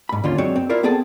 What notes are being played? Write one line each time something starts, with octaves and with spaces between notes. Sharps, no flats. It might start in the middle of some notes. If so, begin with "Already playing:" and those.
G#2 B5
D#2 D3 C#4 F4 C6
F#2 G#3 C4 D4 C#5
C4
E4 F4 A#4 C5 D5
B3 C4 G#4 A4 G5 A5